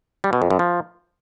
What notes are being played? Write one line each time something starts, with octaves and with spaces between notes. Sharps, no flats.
G3
B2
F2
F#2
F3